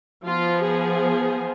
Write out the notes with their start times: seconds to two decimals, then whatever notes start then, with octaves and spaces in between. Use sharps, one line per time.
0.24 F3 B3 F4
0.65 G#4